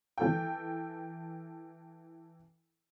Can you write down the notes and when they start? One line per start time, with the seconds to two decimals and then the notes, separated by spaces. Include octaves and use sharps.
0.18 E3 A4 G5